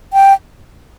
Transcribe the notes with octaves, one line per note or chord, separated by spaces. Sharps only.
G5